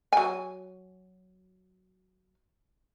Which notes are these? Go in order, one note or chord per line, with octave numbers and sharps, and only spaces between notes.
F#3 G#5